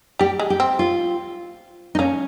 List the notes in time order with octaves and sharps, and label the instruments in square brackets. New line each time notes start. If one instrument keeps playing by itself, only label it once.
[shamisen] G3 [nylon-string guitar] G4
[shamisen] G#3
[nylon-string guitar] G4
[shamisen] C4
[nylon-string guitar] F4
D#4
[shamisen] A#3 [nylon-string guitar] C#4